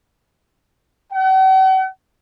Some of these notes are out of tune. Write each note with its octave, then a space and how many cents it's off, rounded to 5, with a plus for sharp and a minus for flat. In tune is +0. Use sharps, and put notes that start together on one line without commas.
F#5 +45